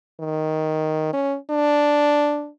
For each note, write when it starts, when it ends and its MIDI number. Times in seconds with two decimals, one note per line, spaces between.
0.20 1.09 51
1.13 1.36 61
1.50 2.49 62